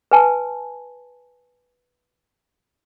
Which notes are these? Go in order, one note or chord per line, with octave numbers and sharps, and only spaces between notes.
B4 G#5 A5